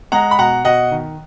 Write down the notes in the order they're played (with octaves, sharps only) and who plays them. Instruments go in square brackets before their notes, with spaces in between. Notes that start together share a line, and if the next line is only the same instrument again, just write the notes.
[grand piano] G#3 F#5 A#5
B5
B2 F#5 A#5
B2 D#5 F#5
D#3